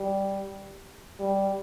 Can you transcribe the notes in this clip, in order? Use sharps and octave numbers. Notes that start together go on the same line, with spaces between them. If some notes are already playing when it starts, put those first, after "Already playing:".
Already playing: G3
G3